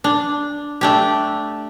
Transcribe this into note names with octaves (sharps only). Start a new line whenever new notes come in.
D4
A3 D4 G4